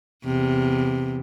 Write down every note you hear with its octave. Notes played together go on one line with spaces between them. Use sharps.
E2 C3